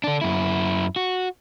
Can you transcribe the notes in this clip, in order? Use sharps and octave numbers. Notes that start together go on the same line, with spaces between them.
D3 D4
F#2 E4
F#4